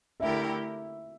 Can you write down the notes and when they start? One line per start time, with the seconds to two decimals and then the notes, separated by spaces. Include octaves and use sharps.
0.20 D3 A3 E4 G4 A#4 E5